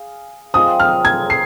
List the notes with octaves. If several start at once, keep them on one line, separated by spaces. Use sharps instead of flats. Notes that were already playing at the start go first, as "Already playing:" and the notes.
Already playing: G#4 F5
C4 F4 G#4 D#5 D#6
F6
G#6
C7